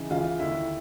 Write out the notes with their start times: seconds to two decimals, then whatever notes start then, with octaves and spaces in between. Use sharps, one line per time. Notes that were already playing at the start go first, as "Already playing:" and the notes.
Already playing: C#3 E3 D#4
0.11 C#2 C#3 E3 F4
0.39 D#2 D3 E4